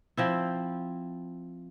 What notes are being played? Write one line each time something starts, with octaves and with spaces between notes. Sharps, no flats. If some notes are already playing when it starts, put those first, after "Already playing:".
F3 C4 E4